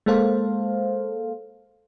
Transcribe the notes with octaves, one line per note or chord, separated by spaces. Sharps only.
G#3 A#3 A4 C5 F5